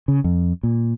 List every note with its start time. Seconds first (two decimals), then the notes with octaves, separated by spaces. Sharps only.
0.08 C#3
0.24 F2
0.63 A#2